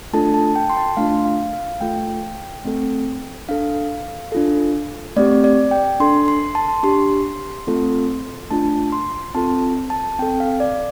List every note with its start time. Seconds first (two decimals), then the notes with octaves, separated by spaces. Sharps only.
0.13 A3 D4 F4 A4 A5
0.34 A5
0.56 G5
0.70 C6
0.77 A5
0.97 A3 D4 F4 F5
1.25 F5
1.53 F5
1.81 A3 F4 A4 G5
2.65 A3 C4 A4
3.49 D4 A4 F5
4.32 D4 F4 A4
5.16 A3 C4 G4 D5
5.44 D5
5.71 G5
6.00 D4 A4 C6
6.28 C6
6.55 A5
6.83 D4 G4 C6
7.67 A3 C4 F4 A4
8.51 A3 D4 F4 A5
8.92 C6
9.35 C4 F4 A4 A5
9.90 A5
10.19 C4 A4 G5
10.40 F5
10.60 D5